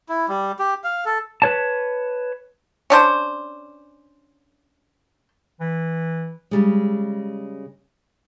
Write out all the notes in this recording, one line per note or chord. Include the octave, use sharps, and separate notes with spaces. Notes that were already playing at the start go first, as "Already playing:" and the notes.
E4
G3
G4
F5
A4
B4 C#5 A5
C#4 D4 C5
E3
C#3 G3 G#3